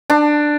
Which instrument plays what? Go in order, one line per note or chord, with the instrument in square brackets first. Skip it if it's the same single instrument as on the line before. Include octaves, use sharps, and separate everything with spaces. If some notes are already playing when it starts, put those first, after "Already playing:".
[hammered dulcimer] D4